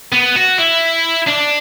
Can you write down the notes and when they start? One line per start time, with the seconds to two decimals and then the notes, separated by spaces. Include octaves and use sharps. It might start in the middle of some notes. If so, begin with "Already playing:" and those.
0.12 B3
0.36 F#4
0.58 E4
1.27 D4